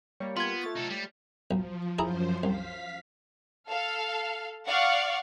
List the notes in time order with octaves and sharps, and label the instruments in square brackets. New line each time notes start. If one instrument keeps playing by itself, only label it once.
[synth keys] G3 A#3 [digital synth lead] C#5
[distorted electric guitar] B3 [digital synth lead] F4 [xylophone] C6 G#6
[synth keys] A3 C#5 A6
[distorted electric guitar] D#4 A4
G3
[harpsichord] B1 [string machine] F3
[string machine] F#2 F3 C5 [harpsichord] E4 G#4 A#5
[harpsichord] C2 [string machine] F5 B6
[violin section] A4 F5
D5 F5 F#5 C#6